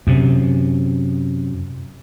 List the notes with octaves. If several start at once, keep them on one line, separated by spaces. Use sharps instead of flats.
F#2 C3